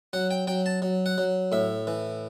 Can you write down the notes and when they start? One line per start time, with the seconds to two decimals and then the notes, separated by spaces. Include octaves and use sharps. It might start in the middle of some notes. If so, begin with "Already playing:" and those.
0.13 F#3 F#5
0.31 G5
0.47 F#3 G5
0.66 A5
0.82 F#3
1.06 F#5
1.18 F#3
1.52 A2 E5
1.87 E3